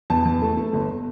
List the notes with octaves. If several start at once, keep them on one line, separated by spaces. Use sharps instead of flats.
E2 A5
E2
A3
A3
G1